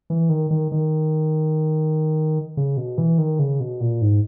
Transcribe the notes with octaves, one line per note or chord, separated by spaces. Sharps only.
E3
D#3
D#3
D#3
C#3
B2
E3
D#3
C#3
B2
A#2
G#2